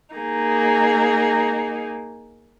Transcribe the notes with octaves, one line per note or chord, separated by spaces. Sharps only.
A#3 D#4 G#4